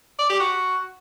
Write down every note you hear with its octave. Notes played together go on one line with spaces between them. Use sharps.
D5
G4
F#4